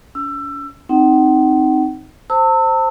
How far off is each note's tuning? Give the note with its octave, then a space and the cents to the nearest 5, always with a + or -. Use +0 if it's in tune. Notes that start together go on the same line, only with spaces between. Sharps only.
C#4 +45 E6 +20
C4 +10 D#4 +0 F#5 +40
C5 +0 A5 +40 E6 -20